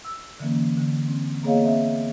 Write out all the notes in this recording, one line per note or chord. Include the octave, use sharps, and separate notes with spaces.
E6
D3 E3 A#3 C#4
D3
C4
A#3 B3 G#4 C#5 D#5 F5
C4 E5